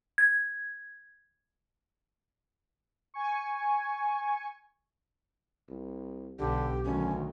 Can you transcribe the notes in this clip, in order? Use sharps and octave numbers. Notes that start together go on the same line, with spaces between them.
G#6
G#5 C#6
C2
B1 D3 G4
D2 D#3 F#3 C#4